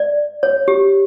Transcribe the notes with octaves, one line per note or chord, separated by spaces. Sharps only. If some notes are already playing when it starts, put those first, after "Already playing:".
Already playing: D5
C#5
G4